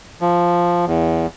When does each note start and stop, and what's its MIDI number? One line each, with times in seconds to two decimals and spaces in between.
0.21 0.85 53
0.87 1.26 40